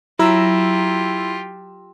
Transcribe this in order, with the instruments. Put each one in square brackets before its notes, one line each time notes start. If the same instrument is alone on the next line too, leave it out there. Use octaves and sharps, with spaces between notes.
[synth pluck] F#3 A#5 E6 [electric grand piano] E4 [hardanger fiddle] F4 G4